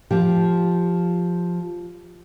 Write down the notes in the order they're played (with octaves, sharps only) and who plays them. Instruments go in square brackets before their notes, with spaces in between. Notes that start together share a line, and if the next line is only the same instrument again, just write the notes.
[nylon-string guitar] F3 G4